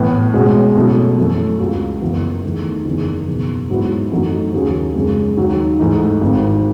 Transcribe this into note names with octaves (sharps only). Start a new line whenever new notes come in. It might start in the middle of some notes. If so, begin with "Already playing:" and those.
Already playing: A2 E3 B3
B2 G#3 C#4 F#4
B2 F#3 A3 C#4 E4
F#2 E3 A3
C#2 C#3 F#3
F#1 F#2 E3 B3
E2 D#3 A3
F#1 E2 D#3
F#1 E2 B2
G#2 F#3 B3 E4
F#2 E3 A3 D#4 F#4
D#2 C#3 F#3 C#4 G#4
F#2 C#3 G#3
D#2 D#3 F#3
G#2 E3 A3 D#4
G#1 G#2 D#3